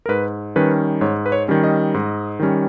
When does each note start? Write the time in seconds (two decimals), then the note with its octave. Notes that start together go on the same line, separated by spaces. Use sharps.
0.06 A#4
0.09 G#2 B4
0.56 D#3 G3 C#4 B4
1.01 G#2 C#5
1.26 B4
1.32 C#5
1.48 D#3 G3 C#4
1.64 D#5
1.94 G#2
2.40 D#3 G3 C#4